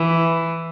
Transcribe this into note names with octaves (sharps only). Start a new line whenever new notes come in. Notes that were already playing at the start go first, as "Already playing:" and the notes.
Already playing: E3